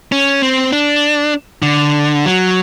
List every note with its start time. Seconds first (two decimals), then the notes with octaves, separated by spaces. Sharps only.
0.12 C#4
0.42 C4
0.72 D4
1.62 D3
2.26 F#3